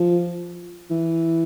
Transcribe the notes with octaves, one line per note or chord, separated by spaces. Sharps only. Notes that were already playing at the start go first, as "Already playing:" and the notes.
Already playing: F3
E3